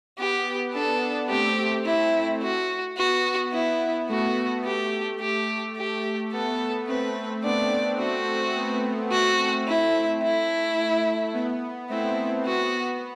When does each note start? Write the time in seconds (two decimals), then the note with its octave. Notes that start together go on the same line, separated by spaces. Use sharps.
0.18 B3 G4
0.74 B3 D4 A4
1.29 A3 C4 G4
1.86 E4
2.42 F#4
2.97 B3 F#4
3.53 B3 E4
4.09 A3 F#4
4.65 A3 G4
5.20 G4
5.77 G4
6.33 B3 A4
6.88 A3 C4 B4
7.44 B3 D4 D5
7.99 A3 C4 F#4
8.56 B3
9.11 A3 C4 F#4
9.67 A3 E4
10.23 E4
11.34 B3
11.90 A3 C4 E4
12.46 B3 F#4